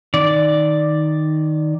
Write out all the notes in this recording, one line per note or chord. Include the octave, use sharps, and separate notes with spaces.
D#3 D5